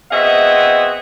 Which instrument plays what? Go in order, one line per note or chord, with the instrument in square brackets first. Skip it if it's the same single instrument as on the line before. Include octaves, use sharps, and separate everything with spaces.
[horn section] B3 C4 F#4 G#4 D#5 E5